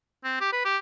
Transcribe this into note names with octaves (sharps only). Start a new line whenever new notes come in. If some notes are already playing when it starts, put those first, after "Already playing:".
C4
G4
B4
G4